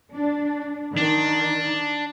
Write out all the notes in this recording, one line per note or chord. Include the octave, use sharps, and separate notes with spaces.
D4
D#3 D4